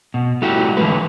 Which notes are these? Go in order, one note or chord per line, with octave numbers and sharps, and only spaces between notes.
B2
G3 A3 E4 F#4 G4
D3 E3 F#3 G#3 B3 B4